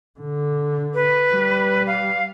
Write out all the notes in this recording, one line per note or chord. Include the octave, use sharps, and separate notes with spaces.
D3
B4
G3
F5